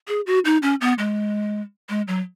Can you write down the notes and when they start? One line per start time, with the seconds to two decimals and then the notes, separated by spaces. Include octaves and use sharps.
0.08 G#4
0.27 F#4
0.45 D#4
0.62 C#4
0.81 B3
0.98 G#3
1.89 G#3
2.08 F#3